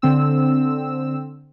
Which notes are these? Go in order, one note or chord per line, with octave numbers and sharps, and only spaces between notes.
D3 C4 E6